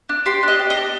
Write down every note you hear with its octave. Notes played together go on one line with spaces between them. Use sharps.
D4
G4 C6
D4 D#5
G4
D#5
D4